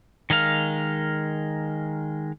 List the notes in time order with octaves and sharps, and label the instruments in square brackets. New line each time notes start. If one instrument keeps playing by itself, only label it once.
[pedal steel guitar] D#3 G#3 A#4 F5